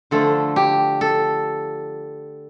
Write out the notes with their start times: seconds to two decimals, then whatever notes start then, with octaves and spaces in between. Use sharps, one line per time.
0.11 D3 F3 A3 A4
0.56 G4
1.01 A4